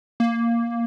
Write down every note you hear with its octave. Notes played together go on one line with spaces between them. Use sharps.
A#3